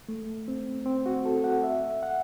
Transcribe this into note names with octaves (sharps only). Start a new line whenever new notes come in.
A3
C4
C4
F#4
A4
F#5
E5
F#5